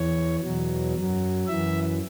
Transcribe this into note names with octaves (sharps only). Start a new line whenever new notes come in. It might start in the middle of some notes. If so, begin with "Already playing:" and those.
Already playing: E2 E3 C#5
E2 B2 F#3
F#2 F#3
F#2 E3 E5